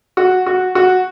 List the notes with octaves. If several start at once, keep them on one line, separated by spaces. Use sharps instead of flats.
F#4
F#4
F#4